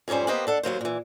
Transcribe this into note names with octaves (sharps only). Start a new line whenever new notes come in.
F2 G#2 G3 C#4 C5
A#3 B3 G4 B4 C5 D#5
D4 A4 F#5
D#2 F#3 A#3 C5
A#2 E3